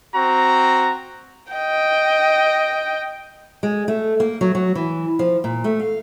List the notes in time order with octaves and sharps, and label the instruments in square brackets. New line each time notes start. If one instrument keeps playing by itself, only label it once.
[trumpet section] C4 F#4 A#5
[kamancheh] D#5 G5
[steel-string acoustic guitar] G#3
A3
A#3
F#3
F#3
E3
F3
A#2
A3
F5